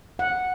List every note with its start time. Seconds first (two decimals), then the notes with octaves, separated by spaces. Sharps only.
0.19 F#5